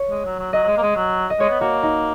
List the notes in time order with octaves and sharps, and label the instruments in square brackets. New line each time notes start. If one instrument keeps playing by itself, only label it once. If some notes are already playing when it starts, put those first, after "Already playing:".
Already playing: [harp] C#5
[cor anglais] G#3
F#3
F#3
[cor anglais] F#3 [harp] D#5
[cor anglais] F#3
G#3
A#3
G#3
F#3
[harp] D#5
[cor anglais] G#3 [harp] C#5
[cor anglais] B3
[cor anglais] A#3 [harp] F#4
[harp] D#4